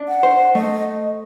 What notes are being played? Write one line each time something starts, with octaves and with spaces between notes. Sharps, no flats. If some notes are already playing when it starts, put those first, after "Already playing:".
Already playing: D4
F#5
C5
A3 D#5